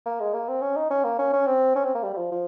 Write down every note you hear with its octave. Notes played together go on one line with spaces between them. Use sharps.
A#3
G#3
A#3
C4
C#4
D#4
C#4
A#3
C#4
C#4
C4
C#4
C4
A#3
G3
G3
F3
F3